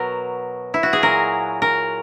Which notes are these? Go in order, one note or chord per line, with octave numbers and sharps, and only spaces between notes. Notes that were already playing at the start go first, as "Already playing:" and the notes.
Already playing: B2 F#3 A#4
E4
F#4
G#4
A#2 F#3 A#4
A#4